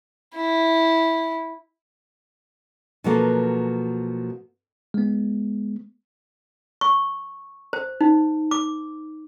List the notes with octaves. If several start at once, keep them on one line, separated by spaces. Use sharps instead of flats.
E4
B2 F3 F#3 A#3 B3 A4
G#3 B3
C#6
C5
D#4
D6